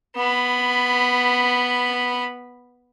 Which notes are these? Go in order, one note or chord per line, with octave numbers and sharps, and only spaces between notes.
B3 B5